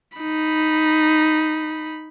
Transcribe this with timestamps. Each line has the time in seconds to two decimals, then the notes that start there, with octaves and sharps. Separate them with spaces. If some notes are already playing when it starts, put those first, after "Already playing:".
0.17 D#4 B5